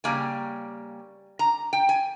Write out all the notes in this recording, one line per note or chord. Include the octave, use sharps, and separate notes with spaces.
C#3 G3 A#3 G#5
A#5
G5
G#5